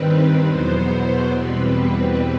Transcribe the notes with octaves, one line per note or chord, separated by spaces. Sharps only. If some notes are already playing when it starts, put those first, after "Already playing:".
Already playing: G2 D#3 G3 C4 B4
E2 B2 F#3 B3 C5
E2 B2 G3 C4 B4